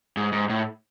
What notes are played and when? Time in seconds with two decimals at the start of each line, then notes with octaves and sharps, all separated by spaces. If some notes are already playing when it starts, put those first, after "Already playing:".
0.17 G#2
0.33 G#2
0.50 A2